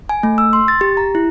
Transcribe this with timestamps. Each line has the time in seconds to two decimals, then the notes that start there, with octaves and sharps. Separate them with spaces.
0.09 G#5
0.23 A3
0.38 E6
0.53 C6
0.68 A6
0.81 G4
0.97 A#5
1.15 E4